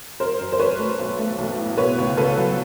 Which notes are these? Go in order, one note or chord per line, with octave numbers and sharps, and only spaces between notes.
F#2 A#4 C5
F#2
C5
F#2 B4 C#5
A3
B1
A3
B1
A2
B2 B4 C#5
C#2
C#2 A4 B4
F#3